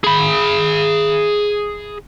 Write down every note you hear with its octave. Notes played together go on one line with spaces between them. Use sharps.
G#4 B5